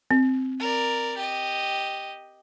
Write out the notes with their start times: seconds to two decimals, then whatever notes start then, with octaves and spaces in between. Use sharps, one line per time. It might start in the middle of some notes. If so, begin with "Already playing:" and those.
0.11 C4
0.60 A#4 D5
1.17 G4 D#5